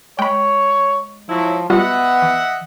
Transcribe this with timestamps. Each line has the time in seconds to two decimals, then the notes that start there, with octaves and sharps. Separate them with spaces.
0.19 G#3 C#5 G5 B5
1.29 F3 F#3 E4
1.70 G3 B3 F4 F#4 D#5 E5 F#5
2.22 E3